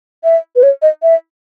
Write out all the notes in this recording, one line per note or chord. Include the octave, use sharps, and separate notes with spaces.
E5
B4
C#5
D#5
E5